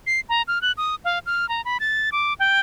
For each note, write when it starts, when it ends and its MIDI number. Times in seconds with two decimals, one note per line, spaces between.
0.07 0.20 96
0.29 0.42 82
0.48 0.61 89
0.62 0.72 90
0.77 0.95 87
1.05 1.19 77
1.26 1.48 89
1.49 1.61 82
1.65 1.78 83
1.80 2.10 93
2.12 2.34 86
2.40 2.60 79